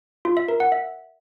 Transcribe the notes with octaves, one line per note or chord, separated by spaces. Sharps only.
F4
E5
A#4
F#5
E5